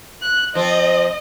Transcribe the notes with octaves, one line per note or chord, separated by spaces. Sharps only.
F#6
F3 C4 D#5